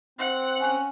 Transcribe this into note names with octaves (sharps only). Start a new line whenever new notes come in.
C4 F#5
C#4